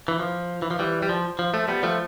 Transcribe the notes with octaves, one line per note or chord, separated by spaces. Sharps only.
E3
F3
E3
F3
E3 G3
G3
F3
F3
F3 A3
G3 B3
F3 A3